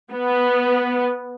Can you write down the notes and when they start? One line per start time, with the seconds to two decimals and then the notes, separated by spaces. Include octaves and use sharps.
0.11 B3